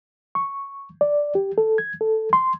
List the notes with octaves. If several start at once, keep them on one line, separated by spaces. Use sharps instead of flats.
C#6
D5
G4
A4
G#6
A4
C6